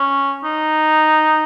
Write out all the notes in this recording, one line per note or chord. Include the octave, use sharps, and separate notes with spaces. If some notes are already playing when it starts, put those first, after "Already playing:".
Already playing: C#4
D#4